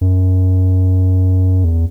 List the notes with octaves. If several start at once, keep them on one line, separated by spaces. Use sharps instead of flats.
F#2
E2